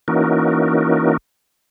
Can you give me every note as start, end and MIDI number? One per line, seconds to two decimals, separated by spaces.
0.08 1.17 52
0.08 1.17 58
0.08 1.17 61
0.08 1.17 63
0.08 1.17 66
0.08 1.17 70